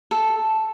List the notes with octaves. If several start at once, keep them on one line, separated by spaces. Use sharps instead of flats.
A4